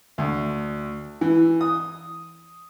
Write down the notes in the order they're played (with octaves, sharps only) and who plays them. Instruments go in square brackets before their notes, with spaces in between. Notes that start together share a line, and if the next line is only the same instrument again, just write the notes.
[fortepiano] D2
E3
D#6